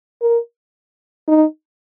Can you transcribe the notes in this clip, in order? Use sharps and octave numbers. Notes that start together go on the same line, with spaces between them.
A#4
D#4